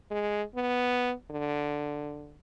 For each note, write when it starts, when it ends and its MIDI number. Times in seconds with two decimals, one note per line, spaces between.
0.11 0.43 56
0.56 1.13 59
1.31 2.37 50